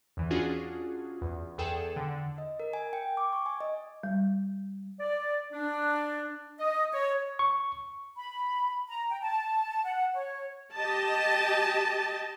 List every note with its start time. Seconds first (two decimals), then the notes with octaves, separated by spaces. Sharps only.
0.17 E2 E3
0.30 C#4 D4 F4 F#4 G#4
1.22 E2
1.58 E2 G#4 A4 G5 E7
1.96 D3
2.38 D#5
2.60 A#4
2.73 G#5
2.93 G5
3.17 D6
3.33 C#6
3.46 G#5
3.61 D#5
4.04 G3
5.00 D5
5.52 D4
6.59 D#5
6.92 C#5
7.39 C#6
8.16 B5
8.87 A#5
9.10 G5
9.21 A5
9.83 F#5
10.13 C#5
10.75 G4 D#5 A5